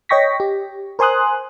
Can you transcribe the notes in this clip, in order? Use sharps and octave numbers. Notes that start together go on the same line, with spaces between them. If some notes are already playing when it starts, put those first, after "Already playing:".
C#5 D#5 G5 C#6 A#6 B6
G4
A#4 C5 G#5 C6 D#6 F#6